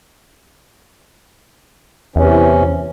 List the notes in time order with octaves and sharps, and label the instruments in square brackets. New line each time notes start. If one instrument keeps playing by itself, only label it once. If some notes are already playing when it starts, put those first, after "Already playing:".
[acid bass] E2 [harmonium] C3 E3 C#4